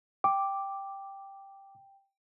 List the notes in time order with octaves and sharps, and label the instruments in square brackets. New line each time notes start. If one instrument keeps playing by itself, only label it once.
[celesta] G5 [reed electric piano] D6